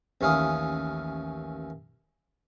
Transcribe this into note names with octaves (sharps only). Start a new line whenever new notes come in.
A1 D#2 C#4 E4 F5 D#6